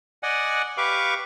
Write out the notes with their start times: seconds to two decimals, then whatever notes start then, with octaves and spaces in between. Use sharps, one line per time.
0.23 D5 D#5 F#5 G#5
0.77 G4 B4 F5 C#6 D6